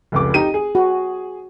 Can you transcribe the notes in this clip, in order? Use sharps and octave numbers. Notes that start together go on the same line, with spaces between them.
F1 C#2 D6
D#4 G4 D#7
G#4
F#4